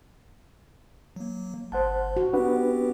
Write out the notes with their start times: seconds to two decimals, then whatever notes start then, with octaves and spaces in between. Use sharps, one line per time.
1.16 F#3 A#3
1.72 G1 C5 F#5 A5
2.17 F#4
2.33 B3 C4 D4 G4 B4 F#5